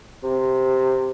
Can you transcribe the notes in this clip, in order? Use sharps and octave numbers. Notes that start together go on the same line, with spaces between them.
C3